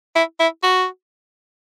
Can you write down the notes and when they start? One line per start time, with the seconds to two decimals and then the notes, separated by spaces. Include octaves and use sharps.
0.16 E4
0.40 E4
0.64 F#4